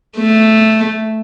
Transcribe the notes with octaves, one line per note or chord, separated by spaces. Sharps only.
A3